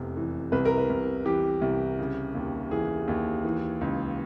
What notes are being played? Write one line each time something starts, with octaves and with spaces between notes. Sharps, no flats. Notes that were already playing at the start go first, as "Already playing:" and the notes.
Already playing: F1 E2 C3
E3
C2 B4
A#4
B4
C2
E3 G4
C2
C#3
D#2
E3 G#4
D#2
E3
C#2